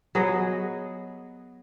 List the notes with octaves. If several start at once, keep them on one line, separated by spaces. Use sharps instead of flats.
F#3 B3 G#4 D#5